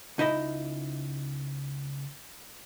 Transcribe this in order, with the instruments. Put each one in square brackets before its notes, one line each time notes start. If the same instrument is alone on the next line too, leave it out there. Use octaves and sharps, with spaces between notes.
[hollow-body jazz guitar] C#2 D#4 E4 D#5